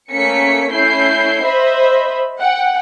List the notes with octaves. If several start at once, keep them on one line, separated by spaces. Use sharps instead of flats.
A3 A#3 C#4 B6 C#7
A3 C#4 E4 G6 C7
C5 D#5 E5 B5
F#5 G5